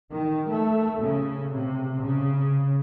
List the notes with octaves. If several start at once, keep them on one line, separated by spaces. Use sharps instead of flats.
D#3
A3
C#3
C3
C#3